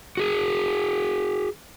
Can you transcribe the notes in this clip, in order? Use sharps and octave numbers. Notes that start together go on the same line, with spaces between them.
F#4 G#4